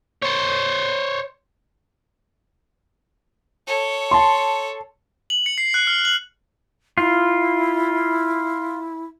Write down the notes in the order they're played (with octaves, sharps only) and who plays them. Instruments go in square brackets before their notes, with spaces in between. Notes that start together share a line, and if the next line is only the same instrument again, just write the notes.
[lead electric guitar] C5 C#5
[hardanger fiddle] A4 C#5
[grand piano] A5 C6
[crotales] F#7
C#7
C7
F#6
F6
F#7
[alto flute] E4 [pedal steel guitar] F4